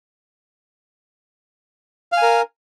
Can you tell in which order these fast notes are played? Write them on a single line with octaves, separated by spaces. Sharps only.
F5 G#5 A#4